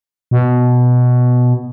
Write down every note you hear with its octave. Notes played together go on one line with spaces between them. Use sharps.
B2